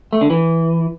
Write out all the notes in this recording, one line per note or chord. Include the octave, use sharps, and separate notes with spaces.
A3
D3
E3